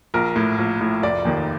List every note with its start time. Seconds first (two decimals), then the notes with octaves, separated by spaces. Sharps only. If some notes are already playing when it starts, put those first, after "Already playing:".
0.14 A#1 A#4
0.36 A2
0.58 A#1
0.81 A2
1.03 F1 D5
1.25 D#2 D#3